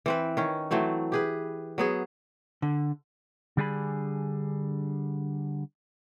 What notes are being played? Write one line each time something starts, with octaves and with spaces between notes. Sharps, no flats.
E3 C4 B4
D#3 C#4
E3 F#3 A3 C4
G4 G#4 B4
F#3 B3 G#4
D3
D3 G3 D4 G#4 G#5 B5